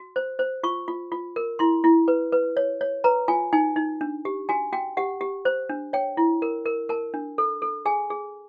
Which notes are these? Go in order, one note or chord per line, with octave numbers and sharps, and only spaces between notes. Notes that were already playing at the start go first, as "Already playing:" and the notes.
Already playing: F#4
C5
C5
F4 C#6
F4
F4
A#4
E4 C6
E4
B4
B4
C#5
C#5
B4 A#5
F4 G#5
D#4 G#5
D#4
D4
G4
F#4 G#5
F#4 G5
G4 F#5
G4
C5
D4
C#5 G5
E4
A#4
A#4
A#4 A5
D4
A4
A4
G#4 G#5
G#4